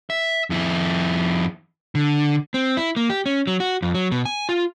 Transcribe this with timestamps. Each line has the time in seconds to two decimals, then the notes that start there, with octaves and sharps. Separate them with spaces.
0.10 E5
0.50 F2 E4
1.95 D3
2.54 C4
2.77 E4
2.96 A#3
3.10 G4
3.26 C#4
3.47 F#3
3.60 F#4
3.82 F2
3.95 F#3
4.12 B2
4.25 G#5
4.49 F4